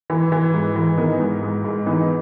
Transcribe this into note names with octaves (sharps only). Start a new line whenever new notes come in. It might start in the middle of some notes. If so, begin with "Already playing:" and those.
E3
E3
G#2
E3
D#3 B3 D#4
G#2
G#2
G#2
E3 B3 D#4